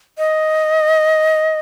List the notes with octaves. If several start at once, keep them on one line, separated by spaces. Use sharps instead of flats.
D#5